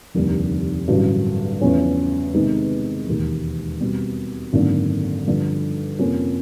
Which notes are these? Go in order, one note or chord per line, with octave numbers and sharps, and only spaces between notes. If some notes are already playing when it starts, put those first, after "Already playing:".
F1 D#2 D3 G3
A1 G2 D3 F#3
E2 C#3 F3 A3 C#4
C3 D#3 G#3 B3 D#4
E1 D#2 D#3
B2 G3 C4
G#1 F#2 D3 F#3 A#3
G2 D3 F3
F2 C3 F3 A#3 C#4